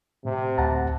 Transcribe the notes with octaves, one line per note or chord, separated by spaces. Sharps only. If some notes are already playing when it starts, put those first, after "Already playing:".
A2 C3
D2 F#5 A5 A#5